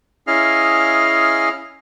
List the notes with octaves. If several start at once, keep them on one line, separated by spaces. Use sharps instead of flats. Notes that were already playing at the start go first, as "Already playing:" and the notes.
C#4 E4 G#4 D#5 F5 F6